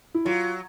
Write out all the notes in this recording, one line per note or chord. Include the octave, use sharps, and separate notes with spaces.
E4
F#3 F4